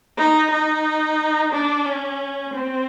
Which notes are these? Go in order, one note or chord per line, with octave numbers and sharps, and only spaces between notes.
D#4
D#4
D4
C#4
C4